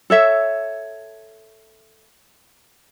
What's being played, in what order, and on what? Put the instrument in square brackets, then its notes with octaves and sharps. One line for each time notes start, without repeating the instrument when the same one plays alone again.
[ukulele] A4 C#5 E5